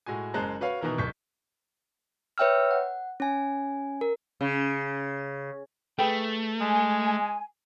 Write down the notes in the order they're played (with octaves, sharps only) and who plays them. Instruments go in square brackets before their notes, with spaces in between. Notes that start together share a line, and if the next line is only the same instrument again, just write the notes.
[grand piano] A2 G#3 F#4 G#5
F#1 G#3 C5 A5 A#5 F#6
F#4 B4 C#5 F5
B2 D#3 E3 A#4
D1 C#6 G6 B6
[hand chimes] B4 C#5 E5 G5 E6 F6
F#5
C#4 G#5
A#4
[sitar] C#3
[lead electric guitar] A3 [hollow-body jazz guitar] G#4 B4 G5
[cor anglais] G#3 [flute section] G#5